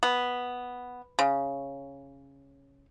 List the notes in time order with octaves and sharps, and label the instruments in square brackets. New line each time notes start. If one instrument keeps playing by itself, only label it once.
[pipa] B3
C#3